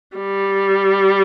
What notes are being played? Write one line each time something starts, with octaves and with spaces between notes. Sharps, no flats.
G3